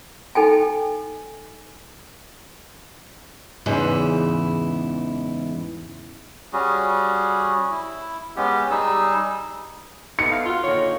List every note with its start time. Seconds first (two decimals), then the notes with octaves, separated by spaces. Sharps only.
0.35 D#4 A4 G5 G#5
3.66 E2 G#2 C#3 E3 E4
6.53 G3 C#4 F#4 G#4
7.71 E4
8.36 G#3 B3 C#4 G4
8.71 G3 D#4 G#4 E6
10.19 B3 D#4 E4 A4 C#7
10.31 F5
10.45 F4 F#4 F5
10.64 A#2 D3 D#3 C#5